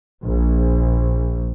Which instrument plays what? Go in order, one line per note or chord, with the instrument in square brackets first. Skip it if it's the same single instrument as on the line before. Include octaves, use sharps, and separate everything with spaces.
[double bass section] A#1